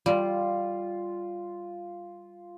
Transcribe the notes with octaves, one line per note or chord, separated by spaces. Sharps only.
G3 F4